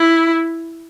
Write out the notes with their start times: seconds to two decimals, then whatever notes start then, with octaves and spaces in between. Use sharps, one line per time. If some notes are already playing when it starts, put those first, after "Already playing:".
Already playing: E4